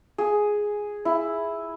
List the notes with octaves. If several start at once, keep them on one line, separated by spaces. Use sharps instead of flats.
G#4
E4